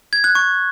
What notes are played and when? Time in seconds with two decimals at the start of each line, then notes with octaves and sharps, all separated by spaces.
0.13 G#6
0.24 F#6
0.35 C#6